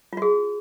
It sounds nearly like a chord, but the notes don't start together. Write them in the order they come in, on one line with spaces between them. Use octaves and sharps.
F4 F#4 G#4